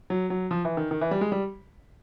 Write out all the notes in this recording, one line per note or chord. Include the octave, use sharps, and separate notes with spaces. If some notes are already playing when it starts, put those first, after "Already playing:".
F#3
F#3
F3
E3
D#3
D#3
E3
G3
G#3
G3